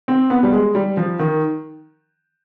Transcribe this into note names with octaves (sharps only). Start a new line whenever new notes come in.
C4
B3
G3
G#3
G3
F3
D#3